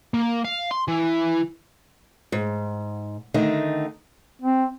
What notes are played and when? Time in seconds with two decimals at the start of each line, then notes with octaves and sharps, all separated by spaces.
0.14 A#3
0.44 F5
0.71 C6
0.88 E3
2.32 G#2
3.34 D3 D#3 A3 D#4
4.42 C4